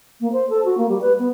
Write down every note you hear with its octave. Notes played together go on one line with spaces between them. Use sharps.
A#3
C5
A4
F#4
A#3
G3
B4
B3